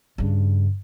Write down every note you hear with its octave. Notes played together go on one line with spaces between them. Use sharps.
G2 C#3